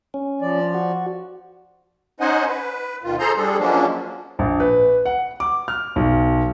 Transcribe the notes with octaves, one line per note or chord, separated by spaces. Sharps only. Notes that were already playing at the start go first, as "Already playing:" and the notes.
C#4
F3 D5
F#4
C#4 D#4 C5 D#5 F#5 G#5
B4
D2 B2 D#3 F4
G#4 A4 C5 A#5 C6
G3 D4 G#4 A4
F3 F#3 G#3 A#3 C#4 D4
A#1
B4
F#5
D6
F6
B1